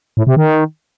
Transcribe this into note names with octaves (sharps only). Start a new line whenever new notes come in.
A2
C3
D#3